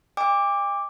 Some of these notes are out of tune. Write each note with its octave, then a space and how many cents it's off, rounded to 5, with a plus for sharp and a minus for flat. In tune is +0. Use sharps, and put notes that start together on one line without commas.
D#5 +0 G5 +45 D6 +0